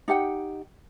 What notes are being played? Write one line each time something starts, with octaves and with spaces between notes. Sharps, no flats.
D#4 G4 F#5 G5